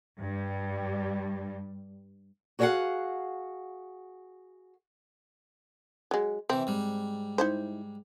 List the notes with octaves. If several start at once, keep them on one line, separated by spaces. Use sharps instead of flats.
G2 G3
F#4 G#4 C#5 D#5 F5 F#5
F#3 G#3
C3 E3 C4
G#2 G3
D#4 E4 C5